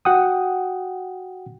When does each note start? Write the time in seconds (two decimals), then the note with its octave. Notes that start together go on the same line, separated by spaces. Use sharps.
0.05 F#4 F#5 G5 D#6